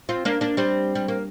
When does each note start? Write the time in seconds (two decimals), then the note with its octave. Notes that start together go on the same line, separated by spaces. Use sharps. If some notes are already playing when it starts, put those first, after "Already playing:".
0.09 C4 F4
0.25 A#3 D4
0.41 A#3 D4
0.57 G3 C4
0.95 G3
1.08 A#3